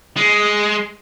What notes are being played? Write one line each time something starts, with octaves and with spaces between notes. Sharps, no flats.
G#3